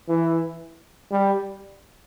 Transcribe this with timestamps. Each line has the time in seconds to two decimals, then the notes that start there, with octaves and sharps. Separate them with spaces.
0.08 E3
1.11 G3